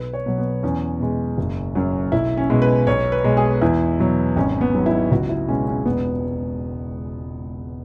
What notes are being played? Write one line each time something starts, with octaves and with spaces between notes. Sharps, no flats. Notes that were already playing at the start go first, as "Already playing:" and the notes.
Already playing: B1 B4
C#5
B2 F#3
B3
E2 C#4
B2 G#3
F#1
F#2 F#3
B1 E4
C#4
B2 G#3
B4
B1 C#5
B4
B2 G#3
G#4
E2 E4
B2 F#3
G#1 C#4
B3
G#2 F#3
E4
C#2 F#4
E4
B2 G#3 C#4
C#4
E1 B3